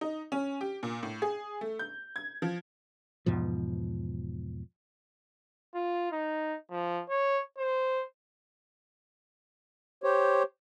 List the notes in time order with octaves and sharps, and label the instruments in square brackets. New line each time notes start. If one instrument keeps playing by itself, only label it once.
[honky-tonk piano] D#4
C#4
G4
A#2
A2
G#4
A3
G6
G#6
F3
[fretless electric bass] E2 G#2 B2 F3
[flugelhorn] F4
D#4
F3
C#5
C5
[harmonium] G4 C5 C#5